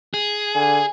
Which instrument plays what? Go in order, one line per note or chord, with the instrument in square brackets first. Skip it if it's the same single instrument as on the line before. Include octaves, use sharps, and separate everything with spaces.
[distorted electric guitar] G#4
[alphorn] D3 [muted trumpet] G#5